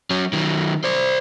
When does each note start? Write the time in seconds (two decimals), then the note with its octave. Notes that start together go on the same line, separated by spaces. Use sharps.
0.10 F#3 C#4
0.33 D#3 F#3
0.84 C5 D5